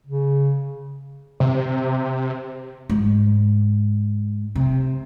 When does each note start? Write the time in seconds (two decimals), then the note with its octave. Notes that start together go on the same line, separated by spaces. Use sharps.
0.07 C#3
1.40 C3
2.90 G#2
4.55 C3